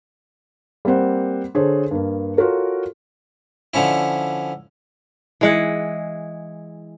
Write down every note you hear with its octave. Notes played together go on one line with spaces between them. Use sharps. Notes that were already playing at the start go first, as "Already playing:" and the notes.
G3 A#3 C4 C5 F#5
D3 G#4 A4 C5 C#5
G2 A#3
F4 F#4 A4 A#4 C#5
D3 F3 C#4 E4
E3 G#3 F#5